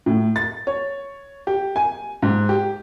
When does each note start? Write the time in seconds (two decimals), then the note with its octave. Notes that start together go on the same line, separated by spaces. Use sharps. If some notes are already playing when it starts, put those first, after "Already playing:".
0.06 A2
0.36 A6
0.67 C#5
1.47 G4
1.76 G#5
2.22 G#2
2.49 G4